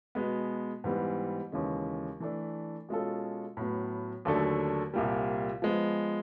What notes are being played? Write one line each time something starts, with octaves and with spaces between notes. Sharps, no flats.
B2 G#3 B3
G#2 E3 G3 B3
D#2 C#3 E3 G#3 C#4
E3 A3 D4
B2 G#3 C#4 F4 A4
A2 F#3 B3
D#2 D3 F#3 A3 D4
C2 A#2 G3
F3 G#3 B3